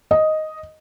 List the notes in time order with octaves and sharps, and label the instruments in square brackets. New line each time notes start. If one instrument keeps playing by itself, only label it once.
[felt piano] D#5